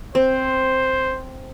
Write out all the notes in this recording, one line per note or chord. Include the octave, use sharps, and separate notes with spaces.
C4 C5